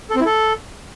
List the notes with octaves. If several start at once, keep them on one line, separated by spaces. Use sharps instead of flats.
A4
C4
E4
A4